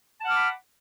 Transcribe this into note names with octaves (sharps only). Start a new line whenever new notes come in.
F#5 A5 B5 D6 F6